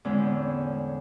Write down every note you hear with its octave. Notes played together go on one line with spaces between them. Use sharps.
E2 A2 D3 G#3 C4 C#4